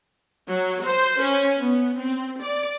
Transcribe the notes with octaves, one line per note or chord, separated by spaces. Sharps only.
F#3
C5
C#4
B3
C4
D5